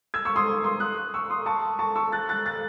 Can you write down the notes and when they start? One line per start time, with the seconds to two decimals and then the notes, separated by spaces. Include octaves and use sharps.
0.14 E6 G#6
0.25 C#6 E6
0.36 C6 D#6
0.64 C6 D#6
0.80 D#6 F#6
1.14 C#6 E6
1.30 C6 D#6
1.46 A5 C#6
1.79 A5 C#6
1.96 C#6 E6
2.12 F#6 A6
2.29 F#6 A6
2.46 F#6 A6